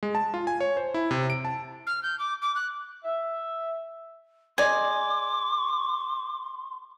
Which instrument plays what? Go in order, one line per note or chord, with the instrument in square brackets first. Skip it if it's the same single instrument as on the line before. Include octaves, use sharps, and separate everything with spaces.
[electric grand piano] G#3
A5
F4
G#5
C#5
C5
E4
C3
D7
A5
[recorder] F6
G6
D6
D6
F#6
[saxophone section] E5
[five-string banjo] G#4 D5 D#5 [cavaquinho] G#5 [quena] C6 [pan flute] D6